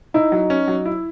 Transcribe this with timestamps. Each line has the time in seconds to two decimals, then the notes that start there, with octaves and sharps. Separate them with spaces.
0.14 D#4 E4
0.32 F#3
0.50 C#4
0.68 F#3
0.85 E4